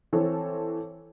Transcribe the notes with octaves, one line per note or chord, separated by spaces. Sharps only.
E3 C4 A4 C#5